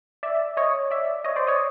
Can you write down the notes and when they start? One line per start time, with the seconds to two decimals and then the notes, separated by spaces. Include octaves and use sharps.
0.23 D5 E5
0.57 C#5 D#5
0.91 D5 E5
1.25 C#5 D#5
1.36 C5 D5
1.47 C#5 D#5